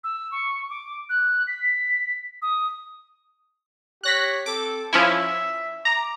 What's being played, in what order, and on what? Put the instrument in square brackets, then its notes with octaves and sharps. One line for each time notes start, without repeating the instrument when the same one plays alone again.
[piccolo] E6
C#6
D6
F#6
B6
D#6
[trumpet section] G4 C#5 [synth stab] F#6 A#6 B6
[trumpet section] C4 A4 [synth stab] D6
[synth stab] F3 C#4 E4 [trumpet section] E5
[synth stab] A#5 [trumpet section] D6